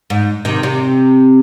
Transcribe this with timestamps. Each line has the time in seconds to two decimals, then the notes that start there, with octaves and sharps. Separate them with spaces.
0.10 G#2
0.45 C3 D#3
0.63 C3